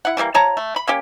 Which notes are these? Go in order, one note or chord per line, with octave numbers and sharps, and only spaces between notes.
E4 F#5
E3 G3 G#3 A#3
F3 C#5 A5 A#5
A3
B5
A#3 C#4 G4